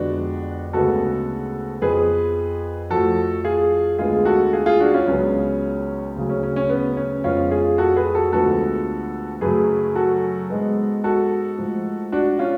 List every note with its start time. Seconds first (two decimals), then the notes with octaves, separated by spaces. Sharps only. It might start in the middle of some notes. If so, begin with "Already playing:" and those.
Already playing: F2 D3 G#3 B3 D4 F#4
0.73 D2 C#3 G#3 B3 F#4 A4
1.82 F2 F3 B3 G#4 B4
2.90 F2 F3 A3 F#4 A4
3.44 F4 G#4
3.99 D2 D3 G#3 B3 F4 G#4
4.25 F#4 A4
4.53 F4 G#4
4.66 F4 G#4
4.80 D4 F#4
4.94 C#4 F4
5.07 C#2 C#3 F#3 B3 C#4
6.16 D2 C#3 F#3
6.29 C#4
6.43 C#4
6.56 C#4
6.69 B3
6.97 C#4
7.24 F2 F3 G#3 B3 C#4 F4
7.51 F4 G#4
7.78 F#4 A4
7.96 G#4 B4
8.14 F#4 A4
8.32 D2 D3 F3 G#3 B3 F#4 A4
9.41 F#2 C#3 F#3 A3 G#4 B4
9.95 F#4 A4
10.50 G#2 G#3 B3
11.04 F#4 A4
11.58 G#2 F3 A3
12.12 D4 F#4
12.39 C#4 F4